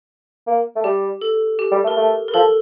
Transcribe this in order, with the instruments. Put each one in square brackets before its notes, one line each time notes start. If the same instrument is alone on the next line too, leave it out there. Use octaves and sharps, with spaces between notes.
[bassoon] A#3
A3
[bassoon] G3 [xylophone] G4
[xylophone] A4
G4
[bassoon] G3
A3
[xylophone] A#4
[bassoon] A3 [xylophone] A4
[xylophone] A#4
[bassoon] F3 [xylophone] A4